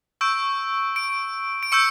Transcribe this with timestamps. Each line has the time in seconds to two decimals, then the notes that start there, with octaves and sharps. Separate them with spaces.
0.21 C#6 E6 G6 D7
0.96 D7
1.63 D7
1.72 C#6 E6 G6 C#7